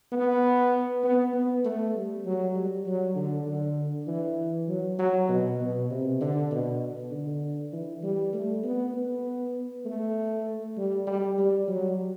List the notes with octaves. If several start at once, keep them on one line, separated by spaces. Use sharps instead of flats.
B3
B3
B3
A3
G3
F#3
G3
F#3
D3
D3
E3
F#3
F#3
B2
B2
C3
D3
B2
D3
E3
G3
A3
B3
B3
A3
G3
G3
G3
F#3